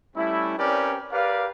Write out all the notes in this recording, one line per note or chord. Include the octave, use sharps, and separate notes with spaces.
G3 A3 C#4 E4
C4 C#4 G4 A#4 B4 D5
G4 A#4 B4 D5 F5